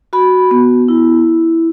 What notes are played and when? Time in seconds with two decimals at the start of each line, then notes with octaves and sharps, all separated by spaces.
0.13 F#4 B5
0.51 B3
0.88 E4